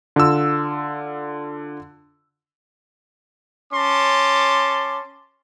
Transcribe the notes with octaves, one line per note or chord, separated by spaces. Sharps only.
D3 F4 E6
C#4 A5 C6 D6